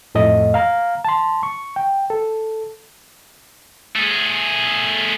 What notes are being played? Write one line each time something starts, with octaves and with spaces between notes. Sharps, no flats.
F2 A2 A3 D#5
F5 A#5 F6
A5 C6
C#6
G5
A4
A3 G#4